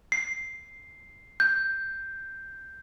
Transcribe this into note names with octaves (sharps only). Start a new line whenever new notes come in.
C7
G6